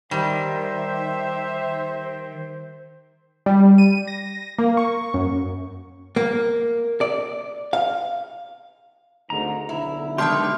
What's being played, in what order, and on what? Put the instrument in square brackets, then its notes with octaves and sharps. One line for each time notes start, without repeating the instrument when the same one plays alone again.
[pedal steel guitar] D#3 [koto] G3 [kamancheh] G4 E5 [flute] C5
[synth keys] G3
D#7
A#6
A#3
C#6
F#2
[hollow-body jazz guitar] A#3
D5
F5
[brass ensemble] G#1 D2 G#2 [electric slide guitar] A#5
[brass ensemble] B1 D3 [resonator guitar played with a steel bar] E4
[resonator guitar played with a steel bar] B2 D#3 [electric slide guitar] G#3 D4 G4 [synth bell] E5 A5 C6